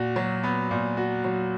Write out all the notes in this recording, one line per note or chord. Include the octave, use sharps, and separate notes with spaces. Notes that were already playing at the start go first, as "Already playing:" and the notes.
Already playing: A#2 F#4
F#3
B3
A#2
F#4
F#3